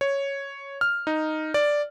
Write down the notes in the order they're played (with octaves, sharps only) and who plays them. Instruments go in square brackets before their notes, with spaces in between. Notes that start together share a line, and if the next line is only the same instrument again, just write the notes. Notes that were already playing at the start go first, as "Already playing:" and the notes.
[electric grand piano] C#5
F6
D#4
D5